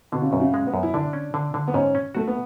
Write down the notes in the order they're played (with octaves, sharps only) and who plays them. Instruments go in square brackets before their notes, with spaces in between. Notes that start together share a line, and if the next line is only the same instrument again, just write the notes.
[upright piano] B2 [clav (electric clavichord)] D3
[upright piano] C#3
[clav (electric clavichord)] F#2 [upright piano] B2
[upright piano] C#3
[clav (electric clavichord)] G#3
[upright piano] B3
[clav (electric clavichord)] F#2
[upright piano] E4
[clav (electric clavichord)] D3 [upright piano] D4
[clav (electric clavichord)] C#4
D3
D3
[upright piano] B3
[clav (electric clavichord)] G#2 [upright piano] C#4
[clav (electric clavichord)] C#4
[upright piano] A3 [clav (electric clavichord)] F#4
[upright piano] B3